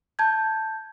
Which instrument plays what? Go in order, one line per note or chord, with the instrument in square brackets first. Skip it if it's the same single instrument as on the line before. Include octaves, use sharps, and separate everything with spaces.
[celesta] A5 G6 G#6